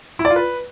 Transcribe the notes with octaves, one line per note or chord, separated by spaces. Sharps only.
E4
D5
F4
B4